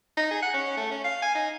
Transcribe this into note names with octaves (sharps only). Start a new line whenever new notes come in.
D#4
G#4
F#5
C#4
A3
C#4
F5
G#5
D#4